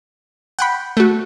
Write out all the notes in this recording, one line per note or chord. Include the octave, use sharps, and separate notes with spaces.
F#5 G5 B5
A3 F#4